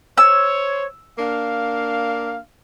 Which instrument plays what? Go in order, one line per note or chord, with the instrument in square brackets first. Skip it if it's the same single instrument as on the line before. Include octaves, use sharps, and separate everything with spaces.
[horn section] C5 C#5 [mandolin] E6
[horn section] A#3 D4 F5